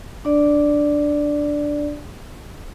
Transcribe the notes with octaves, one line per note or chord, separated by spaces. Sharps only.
D4 D5